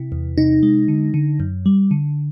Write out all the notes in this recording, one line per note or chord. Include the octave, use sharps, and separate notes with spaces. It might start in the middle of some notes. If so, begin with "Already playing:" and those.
Already playing: C3 E4
E2
C3 D#4
G#3
D3
D3
F#2
G3
D3